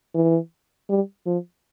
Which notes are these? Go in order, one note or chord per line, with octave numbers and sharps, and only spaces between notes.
E3
G3
F3